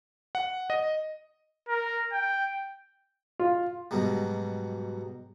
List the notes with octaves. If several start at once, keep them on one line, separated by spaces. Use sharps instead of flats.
F#5
D#5
A#4
G5
F4
G#2 B2 F#3 G3